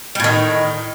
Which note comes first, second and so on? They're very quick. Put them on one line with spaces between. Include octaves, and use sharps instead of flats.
G3 A2 D#3